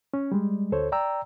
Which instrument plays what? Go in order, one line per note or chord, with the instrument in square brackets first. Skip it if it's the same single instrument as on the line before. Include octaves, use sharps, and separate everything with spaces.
[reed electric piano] C#4
G3 G#3
D2 A4 C5 C#5
D5 G5 A#5 E6